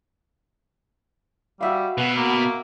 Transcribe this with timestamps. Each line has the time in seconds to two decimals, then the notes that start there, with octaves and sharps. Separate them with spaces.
1.61 G3 F#4 E5 F5
1.98 B2 B4
2.16 A#3